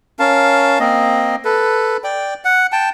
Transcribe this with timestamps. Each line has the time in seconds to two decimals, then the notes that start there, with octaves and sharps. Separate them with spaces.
0.19 C#4 A#4 F5 A5
0.80 A#3 C4 D#5
1.45 A4 B4
2.04 D5 G5
2.45 F#5
2.72 G5 A5